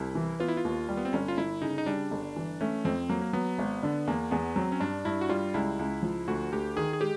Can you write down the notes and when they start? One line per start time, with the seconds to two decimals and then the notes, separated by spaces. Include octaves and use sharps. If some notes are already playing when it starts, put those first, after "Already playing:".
Already playing: C2 E4
0.15 E3
0.40 B3 F4
0.48 E4
0.57 F4
0.65 D#2
0.89 G3
0.97 B3
1.05 C4
1.13 G1 C#4
1.28 F4
1.37 G1 E4
1.62 C#3 D#4
1.78 D#4
1.86 G3 D4
2.11 G1
2.36 E3
2.61 A3 C#4
2.85 F2 C4
3.09 F#3 A#3
3.21 A#3
3.33 F#3 B3
3.58 G#1
3.83 D3
4.07 E2 A#3
4.31 E2 B3
4.56 F#3 C4
4.72 C#4
4.80 G2 D4
5.05 G2 E4
5.21 F#4
5.29 G3 F4
5.54 C#2 E4
5.79 C#2
6.03 F3
6.28 D2 F#4
6.52 D2 G4
6.76 D#3 G#4
6.93 G#4
7.01 G#3 G4